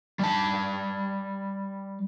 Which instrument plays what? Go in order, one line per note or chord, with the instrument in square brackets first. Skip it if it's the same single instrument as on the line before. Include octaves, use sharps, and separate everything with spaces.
[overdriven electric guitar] G3 A5